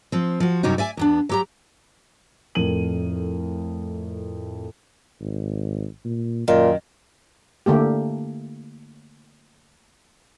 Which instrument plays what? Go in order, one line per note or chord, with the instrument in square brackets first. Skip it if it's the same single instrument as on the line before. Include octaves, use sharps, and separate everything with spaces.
[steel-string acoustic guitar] F3 C4
F3 F#4
F#2 C3 G3 C#4 D#4 F#4
D5 E5 G#5
E2 B3 D4
F#3 G4 A#5
[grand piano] F2 A2 A#4 D#7 F#7
[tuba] G#1
A#2
[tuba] F#2 [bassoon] A#2 [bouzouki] D#3
[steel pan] D3 A3 A#3 G4